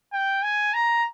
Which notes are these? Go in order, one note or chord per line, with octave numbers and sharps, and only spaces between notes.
G5
G#5
A#5